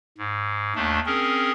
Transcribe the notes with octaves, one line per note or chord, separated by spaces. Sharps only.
G#2
D#2 A3 D4
C4 C#4 G#4 A#4